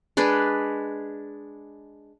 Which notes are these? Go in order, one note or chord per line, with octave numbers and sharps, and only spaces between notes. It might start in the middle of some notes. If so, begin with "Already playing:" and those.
G#3 D4 G#4 B4